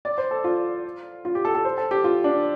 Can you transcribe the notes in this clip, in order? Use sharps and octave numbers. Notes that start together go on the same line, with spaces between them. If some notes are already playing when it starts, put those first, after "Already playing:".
D5
C5
A4
F4
F4
G4
A4
A4
C5
A4
G4
F4
D4